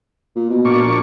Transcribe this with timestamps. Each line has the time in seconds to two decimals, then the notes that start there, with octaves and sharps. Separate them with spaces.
0.36 A#2
0.50 B2
0.65 A#2 D4 C#6
0.81 A#1